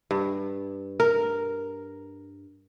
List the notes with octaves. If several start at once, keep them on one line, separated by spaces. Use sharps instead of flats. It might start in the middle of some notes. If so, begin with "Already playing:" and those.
G2
A#4